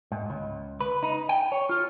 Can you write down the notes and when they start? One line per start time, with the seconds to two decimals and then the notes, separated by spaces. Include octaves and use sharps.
0.12 G#2
0.30 C#2
0.80 B4
1.03 D#4
1.29 G5
1.52 C#5
1.69 F4